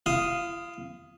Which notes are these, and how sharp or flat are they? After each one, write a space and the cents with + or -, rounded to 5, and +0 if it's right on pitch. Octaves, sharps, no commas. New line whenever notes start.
E4 +45 F5 +0 D#6 +0